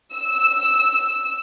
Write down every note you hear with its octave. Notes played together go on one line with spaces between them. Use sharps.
E6